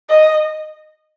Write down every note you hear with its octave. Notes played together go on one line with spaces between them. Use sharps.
D#5